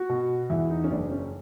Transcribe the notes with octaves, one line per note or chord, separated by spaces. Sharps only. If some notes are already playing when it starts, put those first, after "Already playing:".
Already playing: F#4
B2
E2 E4
D#4
C#4
F#1 D4
C#4